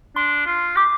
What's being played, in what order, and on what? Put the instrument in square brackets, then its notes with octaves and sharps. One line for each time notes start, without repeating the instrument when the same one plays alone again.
[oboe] D4 [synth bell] C6
[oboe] F4
[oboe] G4 [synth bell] D6